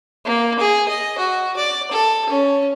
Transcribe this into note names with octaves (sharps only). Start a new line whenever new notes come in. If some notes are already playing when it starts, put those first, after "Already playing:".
A#3
G#4
D#5
F#4
D5
A4
C#4